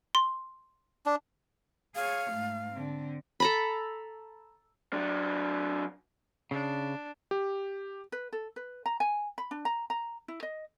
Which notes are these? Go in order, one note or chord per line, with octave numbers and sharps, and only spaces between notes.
C6
D4
G#4 C#5 F5
G#2 A3
D3 C4
A4 A#5 B5
F#3 D4
C#3 D4
G4
B4
A4
B4
A#5
G#5
B5
D4
A#5
A#5
E4
D#5